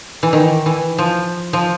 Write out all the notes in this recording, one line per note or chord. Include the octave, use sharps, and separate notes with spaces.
E3
D#3
E3
F3
F3